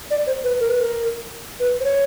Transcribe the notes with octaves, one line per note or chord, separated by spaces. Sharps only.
D5
C5
B4
A#4
B4
A#4
B4
C5
C#5